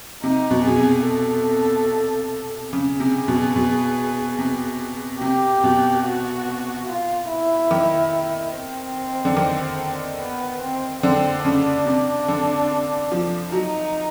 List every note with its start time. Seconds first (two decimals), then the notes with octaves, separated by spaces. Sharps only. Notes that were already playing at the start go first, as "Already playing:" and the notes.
0.23 C3 D#4
0.51 B2
0.65 B2 G#4
0.79 C3
1.07 A4
2.73 C#3 G#4
3.00 C3
3.28 B2
3.56 B2
4.39 C3
5.21 C3 G4
5.64 B2
6.05 F#4
6.88 F4
7.29 E4
7.71 D#3
8.54 C4
9.25 D3
9.37 D#3
10.20 B3
10.62 C4
11.03 D3 C4
11.44 C#3 D4
11.86 C3
12.28 D3
13.12 F3
13.52 F#3 D#4